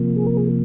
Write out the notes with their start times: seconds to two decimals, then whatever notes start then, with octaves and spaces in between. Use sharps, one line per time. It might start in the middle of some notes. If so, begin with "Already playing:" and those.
Already playing: C3 F3 A#3
0.16 G#4
0.27 A#4
0.37 G#4